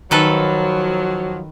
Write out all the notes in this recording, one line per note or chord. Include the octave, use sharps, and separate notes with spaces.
D#3 F3 F#3 A4 B4